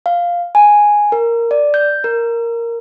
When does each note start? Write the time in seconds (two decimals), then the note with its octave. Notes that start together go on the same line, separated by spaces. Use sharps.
0.06 F5
0.55 G#5
1.12 A#4
1.51 D5
1.74 G6
2.04 A#4